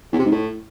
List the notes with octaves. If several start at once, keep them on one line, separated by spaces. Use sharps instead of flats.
E2
C3
G#2
A2